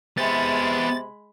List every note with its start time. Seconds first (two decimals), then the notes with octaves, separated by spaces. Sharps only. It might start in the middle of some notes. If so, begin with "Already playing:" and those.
0.18 C3 G#3 B3 E5 B5 A6